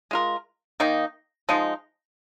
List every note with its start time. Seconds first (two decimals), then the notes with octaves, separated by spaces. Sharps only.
0.11 G#3 F4 A#4
0.80 D#3 A#3 D#4
1.49 F3 G#3 D#4